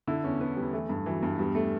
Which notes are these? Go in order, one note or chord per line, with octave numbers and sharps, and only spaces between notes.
D3 E4
E2 C#4
D3 B3
E2 G3
E3 A3
G2
E3 F#3
G2
F#3
E2 G3
A3